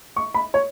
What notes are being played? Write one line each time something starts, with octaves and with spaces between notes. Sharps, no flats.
C#6
B5
C#5